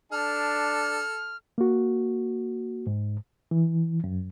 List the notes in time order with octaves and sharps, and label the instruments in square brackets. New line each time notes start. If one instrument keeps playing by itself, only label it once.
[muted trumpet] D4 [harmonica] A4 [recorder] F6
[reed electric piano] A#3 F#4
G#2
E3
F#2